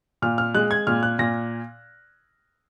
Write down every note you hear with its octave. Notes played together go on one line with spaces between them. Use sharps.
A#2 F6
F6
G#3 F#6
G#6
A#2 F6
F#6
A#2 A#6